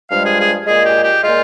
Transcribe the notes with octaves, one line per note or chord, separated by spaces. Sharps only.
G2 F3 G#3 F5
G#4
G#4
A#2 G#3 G#4
G4
G4
A#2 G#3 F4